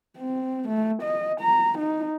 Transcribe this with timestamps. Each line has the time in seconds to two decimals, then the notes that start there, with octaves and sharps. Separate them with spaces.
0.18 C4
0.69 A3
1.02 D#5
1.41 A#5
1.79 D#4